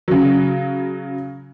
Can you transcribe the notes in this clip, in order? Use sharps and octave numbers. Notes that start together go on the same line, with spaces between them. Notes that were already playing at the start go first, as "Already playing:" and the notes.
C#3 F#3